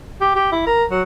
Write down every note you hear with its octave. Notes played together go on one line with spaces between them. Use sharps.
G4
G4
E4
A#4
F#3